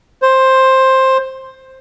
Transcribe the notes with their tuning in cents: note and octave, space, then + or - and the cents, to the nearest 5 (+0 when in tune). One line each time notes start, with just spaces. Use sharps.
C5 +10